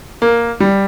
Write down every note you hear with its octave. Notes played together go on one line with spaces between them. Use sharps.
A#3
G3